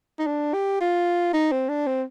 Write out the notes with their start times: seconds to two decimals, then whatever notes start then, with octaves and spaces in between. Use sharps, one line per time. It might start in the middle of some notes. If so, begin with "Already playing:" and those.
0.19 D#4
0.27 D4
0.54 G4
0.80 F4
1.34 D#4
1.52 C4
1.69 D4
1.87 C4